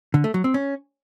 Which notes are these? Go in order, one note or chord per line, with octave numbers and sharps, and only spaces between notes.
D3
A3
F#3
C4
C#4